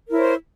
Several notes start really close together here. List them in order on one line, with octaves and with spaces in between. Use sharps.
A#4 E4 C#5 C5